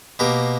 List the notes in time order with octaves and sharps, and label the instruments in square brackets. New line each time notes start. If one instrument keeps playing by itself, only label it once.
[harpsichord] B2 A#3 G4 A#4